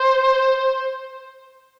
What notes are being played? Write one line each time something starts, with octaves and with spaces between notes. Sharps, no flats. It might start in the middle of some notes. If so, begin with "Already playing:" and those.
Already playing: C5